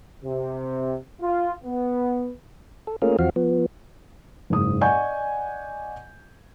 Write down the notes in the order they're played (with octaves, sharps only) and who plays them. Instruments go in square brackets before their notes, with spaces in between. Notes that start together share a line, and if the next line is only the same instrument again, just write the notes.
[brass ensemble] C3
F4
B3
[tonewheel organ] A4
A3 A#3 C#4 F4 G#4 A#4
E2 F3 C4 F#4 F5
F3 B3
[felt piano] F#1 G#2 D#6
D5 D#5 F#5 G#5 C#6 G6